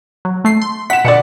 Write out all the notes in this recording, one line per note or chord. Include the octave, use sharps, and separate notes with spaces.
F#3
A3 C7
C6
F#5 B6 E7
B2 D3 D5 F#5 C#7